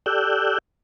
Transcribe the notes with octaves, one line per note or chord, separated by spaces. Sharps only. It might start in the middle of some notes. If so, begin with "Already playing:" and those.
G4 A4 D5 E6 F#6 G6